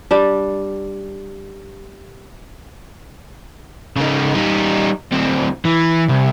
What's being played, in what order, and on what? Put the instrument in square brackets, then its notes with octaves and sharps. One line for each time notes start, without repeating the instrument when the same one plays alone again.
[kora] G3 D4
[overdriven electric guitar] C#3 D#4
G3 D#4
D2 C4
E3
C2